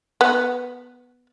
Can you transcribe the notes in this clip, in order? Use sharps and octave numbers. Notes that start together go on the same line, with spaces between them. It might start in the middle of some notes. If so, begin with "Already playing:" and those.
B3